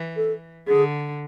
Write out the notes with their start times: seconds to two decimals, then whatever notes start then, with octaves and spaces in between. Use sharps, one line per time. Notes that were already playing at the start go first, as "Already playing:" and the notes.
Already playing: E3
0.17 A4
0.67 D3 G#4